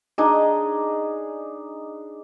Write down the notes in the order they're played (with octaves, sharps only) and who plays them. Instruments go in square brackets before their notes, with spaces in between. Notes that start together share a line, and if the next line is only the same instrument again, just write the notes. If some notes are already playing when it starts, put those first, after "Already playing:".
[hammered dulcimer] D4 D#4 G#4 D#5